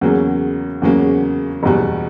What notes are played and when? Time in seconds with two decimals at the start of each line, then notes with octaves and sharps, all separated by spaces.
0.01 E2 C#3 F#3 A#3 C#4
0.82 E2 C#3 F#3 A#3 C#4
1.63 F#1 E2 B2 G3